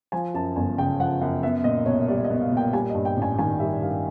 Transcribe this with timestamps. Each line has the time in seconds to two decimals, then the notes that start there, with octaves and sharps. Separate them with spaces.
0.12 F3 G#5
0.34 F#2 A5
0.56 G1 G#5
0.78 C#3 G5
0.99 F3 F#5
1.21 F#2 F#5
1.43 B3 E5
1.64 A#2 D#5
1.86 B1 C#5
2.08 G3 D5
2.24 D#5
2.30 B3
2.41 F5
2.52 A#2 G5
2.73 G3 G#5
2.90 D#5
2.95 G2
3.05 G5
3.17 A1 G#5
3.39 D#3 G#5
3.60 G3 E5
3.82 G2 F5